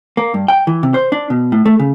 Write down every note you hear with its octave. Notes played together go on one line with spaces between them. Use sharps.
A#3
G2
G5
E3
C3
C5
D4
B2
A2
A3
C#3